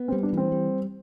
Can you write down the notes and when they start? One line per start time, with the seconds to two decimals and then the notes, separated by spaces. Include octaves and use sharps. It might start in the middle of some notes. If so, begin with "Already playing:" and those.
Already playing: B3
0.08 C4
0.12 G3
0.23 D4
0.33 E3 C4
0.52 G3